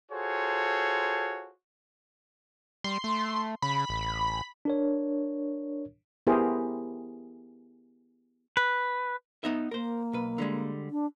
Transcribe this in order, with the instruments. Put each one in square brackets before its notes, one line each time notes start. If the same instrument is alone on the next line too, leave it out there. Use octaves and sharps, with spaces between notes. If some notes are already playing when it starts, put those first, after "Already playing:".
[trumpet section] F4 F#4 G#4 A4 C5 C#5
[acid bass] G3 [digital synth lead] C6
[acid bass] A3
[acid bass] C#3 [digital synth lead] B5
[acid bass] A1
[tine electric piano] D4 A#4 C#5
[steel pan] B3 E4 G4 G#4 A#4 C5
[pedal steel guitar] B4
[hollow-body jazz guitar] B3 D#4 E5
[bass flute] A#3 [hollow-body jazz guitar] A#4 C5
[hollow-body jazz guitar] B1 B4
D3 G3 G#3
[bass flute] D4